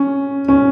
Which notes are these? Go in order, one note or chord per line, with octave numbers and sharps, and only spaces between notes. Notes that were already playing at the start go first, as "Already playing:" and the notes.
Already playing: C#4
C#4